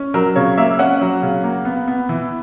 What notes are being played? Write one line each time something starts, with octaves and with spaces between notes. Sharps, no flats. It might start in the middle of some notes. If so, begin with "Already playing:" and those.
Already playing: C#4
F#3 A#4
C#3 C#5
A#3 E5
C#4 F#5
F#3
C#3
A#3
B3
B3
E3